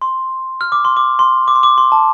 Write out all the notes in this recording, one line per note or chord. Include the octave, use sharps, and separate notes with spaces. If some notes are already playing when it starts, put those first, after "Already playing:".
C6
F6
D6
C6
D6
C6
D6
C6
D6
C6
A5